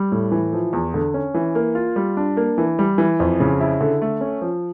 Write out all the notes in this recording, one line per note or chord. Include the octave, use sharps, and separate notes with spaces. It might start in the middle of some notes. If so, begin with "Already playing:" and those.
Already playing: G3
A2
E3
F3
E2
D3
C#4
E3
A#3
F4
G3
D4
A#3
E3
G3
E3
F2
C#3
E4
D3
A3
C#4
F3